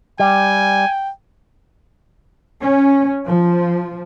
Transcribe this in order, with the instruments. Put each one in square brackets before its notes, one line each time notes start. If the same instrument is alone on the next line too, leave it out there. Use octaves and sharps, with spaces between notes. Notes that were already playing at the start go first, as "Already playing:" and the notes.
[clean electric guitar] G3 [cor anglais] G5 [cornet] G#5
[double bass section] C#4
F3